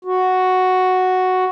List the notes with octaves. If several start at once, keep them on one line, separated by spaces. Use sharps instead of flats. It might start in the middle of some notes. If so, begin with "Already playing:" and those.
F#4